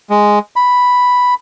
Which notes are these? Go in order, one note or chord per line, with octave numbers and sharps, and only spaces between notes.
G#3
B5